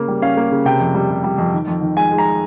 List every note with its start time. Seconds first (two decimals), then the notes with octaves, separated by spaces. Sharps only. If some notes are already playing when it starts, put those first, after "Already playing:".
Already playing: C#3 A#3
0.08 G3
0.22 C#4 F5
0.37 A#3
0.51 C#3
0.65 C3 G5
0.80 F2
0.95 G3
1.10 C3
1.24 G3
1.38 F2
1.53 D#3
1.67 F2
1.82 D#3
1.96 G#3 G#5
2.12 G#3
2.18 A#5